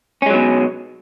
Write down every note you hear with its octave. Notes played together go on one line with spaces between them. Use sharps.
B2 F#3 G#3 C#4